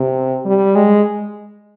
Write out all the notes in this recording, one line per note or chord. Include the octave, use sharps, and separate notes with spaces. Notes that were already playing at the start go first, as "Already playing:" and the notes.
Already playing: C3
G3
G#3